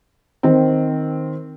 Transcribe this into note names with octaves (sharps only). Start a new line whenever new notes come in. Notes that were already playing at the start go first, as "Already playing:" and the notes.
D#3 C4